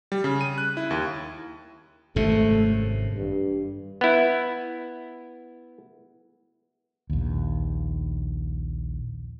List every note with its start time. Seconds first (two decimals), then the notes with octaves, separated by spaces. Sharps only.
0.12 G3
0.24 C#3
0.41 D#7
0.58 F#6
0.77 E4
0.91 D#2
2.16 G#1 F#2 C3 A3
3.15 G2
4.01 B3 E4
7.10 A#1 D#2